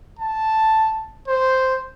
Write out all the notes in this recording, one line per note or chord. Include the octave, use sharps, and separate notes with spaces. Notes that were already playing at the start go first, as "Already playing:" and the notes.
A5
C5